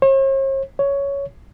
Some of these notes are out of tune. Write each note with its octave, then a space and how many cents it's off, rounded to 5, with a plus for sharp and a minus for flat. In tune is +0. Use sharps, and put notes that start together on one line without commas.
C#5 -45
C#5 +10